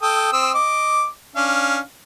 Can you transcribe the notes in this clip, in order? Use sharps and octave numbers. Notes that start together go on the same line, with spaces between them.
A4 G5 D#6
C4 D#6 E6
D#5 D6
C#4 D4 F5